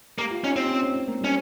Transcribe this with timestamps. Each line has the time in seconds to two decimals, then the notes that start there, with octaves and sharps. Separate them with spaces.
0.18 A#3 G4
0.30 F4
0.44 C#4 D#4
0.52 G4
0.56 C4 F4
0.69 C#4
0.82 C4
0.95 C4
1.08 A#3
1.21 G3
1.24 C#4